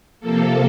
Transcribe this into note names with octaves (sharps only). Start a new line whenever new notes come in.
C3 F3 A#3 A4